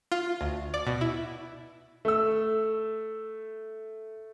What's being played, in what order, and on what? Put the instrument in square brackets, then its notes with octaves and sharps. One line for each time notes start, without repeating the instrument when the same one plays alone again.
[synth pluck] F4
D2
D5
B2
E4
[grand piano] A3 E6